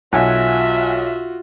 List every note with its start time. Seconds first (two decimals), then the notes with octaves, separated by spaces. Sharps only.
0.13 B1 F4 F#4 E5 F#5 G#5